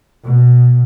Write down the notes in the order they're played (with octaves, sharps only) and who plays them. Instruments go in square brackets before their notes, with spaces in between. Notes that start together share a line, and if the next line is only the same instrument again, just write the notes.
[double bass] B2